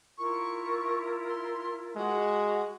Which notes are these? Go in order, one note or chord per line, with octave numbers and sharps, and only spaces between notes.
E4 F4 A#4 C#6
C6
G#3 F#4